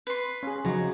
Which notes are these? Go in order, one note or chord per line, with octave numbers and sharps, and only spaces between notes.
B4 C6
C#4 G#4
C#3 F3 F#3 D#4 A#5